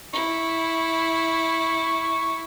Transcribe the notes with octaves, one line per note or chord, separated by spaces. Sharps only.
E4 C#6